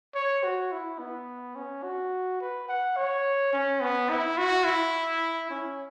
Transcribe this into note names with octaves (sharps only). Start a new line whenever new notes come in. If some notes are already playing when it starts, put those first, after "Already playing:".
C#5
F#4
E4
B3
C#4
F#4
B4
F#5
C#5
C#4
B3
E4
F#4
E4
C#4